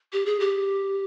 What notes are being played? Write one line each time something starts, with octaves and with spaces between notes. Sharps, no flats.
G4
G#4
G4